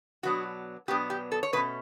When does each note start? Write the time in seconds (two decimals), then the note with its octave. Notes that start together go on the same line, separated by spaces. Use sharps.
0.23 B2 F#3 B3 D4 F#4
0.88 B2 F#3 B3 D4 G4
1.10 G4
1.32 A4
1.43 C#5
1.53 B2 A3 C#4 B4